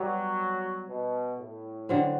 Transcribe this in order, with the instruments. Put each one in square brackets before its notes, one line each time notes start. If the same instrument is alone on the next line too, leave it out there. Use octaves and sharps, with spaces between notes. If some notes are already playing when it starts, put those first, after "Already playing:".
Already playing: [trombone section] F#3 [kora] G3 B3 F#4
[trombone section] B2
A2
[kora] D3 F#3 C4